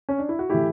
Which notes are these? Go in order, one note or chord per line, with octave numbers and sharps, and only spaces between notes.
C#4
D4
E4
F#4
A2 E3 E4 G4